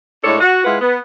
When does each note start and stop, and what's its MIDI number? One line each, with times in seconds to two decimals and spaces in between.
0.24 0.37 45
0.24 0.37 56
0.24 0.37 62
0.24 0.37 69
0.24 0.37 73
0.41 0.63 66
0.65 0.76 56
0.65 0.76 64
0.65 0.76 65
0.65 0.76 71
0.65 0.76 78
0.81 0.96 59